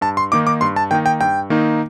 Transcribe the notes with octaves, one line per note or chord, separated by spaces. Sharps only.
G2 A5
C6
D#3 A#3 D#4 D6
D6
G2 C6
A5
D#3 A#3 D#4 G5
G5
G2 G5
D#3 A#3 D#4